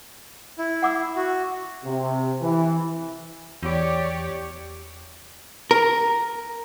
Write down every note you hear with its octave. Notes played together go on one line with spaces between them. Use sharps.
E4
F#5 D6 E6
F#4
C3
E3
E2 G4 C#5 D5
A#4